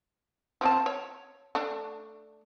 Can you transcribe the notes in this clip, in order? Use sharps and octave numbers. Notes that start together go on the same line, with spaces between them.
F3 C4 A5
C#5
A3 D4